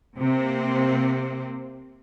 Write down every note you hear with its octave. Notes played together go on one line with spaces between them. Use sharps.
C3 A#3 C4